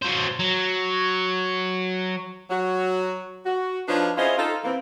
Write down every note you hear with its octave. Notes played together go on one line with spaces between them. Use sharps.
F#3 C5
F#3
F#3 F#4
F#4
F3 D4 D#4 F4 B4 C#5
C#4 E4 F4 G#4 C5 D#5
D#4 F4 A4
E3 A#3 C4